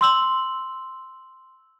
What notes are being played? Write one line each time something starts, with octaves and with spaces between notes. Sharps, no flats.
C6 E6 F#7